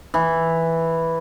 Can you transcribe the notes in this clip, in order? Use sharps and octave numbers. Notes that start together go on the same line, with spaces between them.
E3